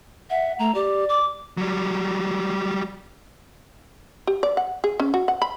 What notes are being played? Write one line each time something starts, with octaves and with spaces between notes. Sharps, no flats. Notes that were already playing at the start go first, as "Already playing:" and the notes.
E5 F#5
A3 A#5
G4 D5
D6
F#3 G3
G4
D5
F#5
G#4
C#4
F#4
F#5
B5